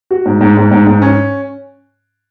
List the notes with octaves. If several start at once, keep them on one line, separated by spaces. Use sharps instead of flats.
F#4
G#2
G#2
G#2
G#2
G#2
C#4